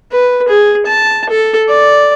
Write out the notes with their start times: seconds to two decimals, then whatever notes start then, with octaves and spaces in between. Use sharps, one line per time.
0.12 B4
0.48 G#4
0.86 A5
1.29 A4
1.68 D5